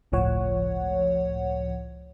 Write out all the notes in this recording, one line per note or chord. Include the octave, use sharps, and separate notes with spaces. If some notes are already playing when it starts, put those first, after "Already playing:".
G1 C#2 A2 F3 C#5 F#5